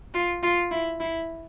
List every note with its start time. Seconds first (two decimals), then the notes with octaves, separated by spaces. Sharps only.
0.14 F4
0.43 F4
0.71 E4
1.00 E4